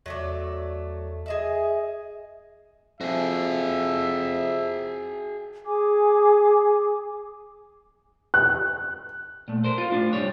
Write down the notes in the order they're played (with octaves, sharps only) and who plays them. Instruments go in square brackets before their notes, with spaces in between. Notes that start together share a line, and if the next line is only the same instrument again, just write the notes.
[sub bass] E2 [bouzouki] F#3 A3 D5
[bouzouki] G#4 D#5 E5
[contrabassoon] F2 [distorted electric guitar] F#4 G#4 [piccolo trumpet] E5
[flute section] G#4 G#5 D6
[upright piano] F#6
[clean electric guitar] A#2 A3
A#4 C5
F4
A2 D4
C2 G2 G3 C#5